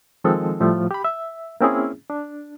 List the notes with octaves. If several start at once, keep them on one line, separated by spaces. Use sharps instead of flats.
D#3 F3 G#3 C4 D#4 A4
A2 F3 G3 A3
G4 B5
E5
A#3 C4 C#4 E4 G#4
D4